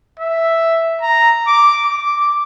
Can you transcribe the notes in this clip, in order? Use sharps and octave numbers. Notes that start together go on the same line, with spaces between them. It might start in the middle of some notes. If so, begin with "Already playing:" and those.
E5
A#5
D6
D6